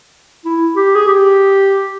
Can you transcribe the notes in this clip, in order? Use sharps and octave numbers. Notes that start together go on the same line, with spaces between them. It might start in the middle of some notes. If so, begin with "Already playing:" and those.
E4
G4
G#4
G4